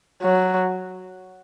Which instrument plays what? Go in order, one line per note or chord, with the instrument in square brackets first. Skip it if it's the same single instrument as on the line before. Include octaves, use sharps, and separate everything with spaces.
[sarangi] F#3